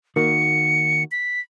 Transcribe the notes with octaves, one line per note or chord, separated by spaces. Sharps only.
D#3 A#3 F#4 C#7
B6